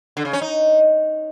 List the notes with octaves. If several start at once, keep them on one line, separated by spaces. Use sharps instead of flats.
D3
C#3
C#4
D#4